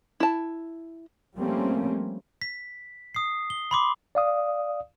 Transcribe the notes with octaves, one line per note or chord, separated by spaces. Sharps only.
E4 A5
F3 G3 A3 A#3 C4 C#4
B6
D#6 C7
G7
B5 C6 D6
D5 F5 D#6